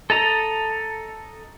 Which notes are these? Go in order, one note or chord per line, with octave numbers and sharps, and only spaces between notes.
A4 D#5 A#5